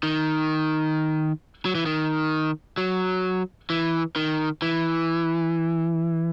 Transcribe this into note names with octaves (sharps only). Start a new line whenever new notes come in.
D#3
F#3
E3
D#3
F#3
E3
D#3
E3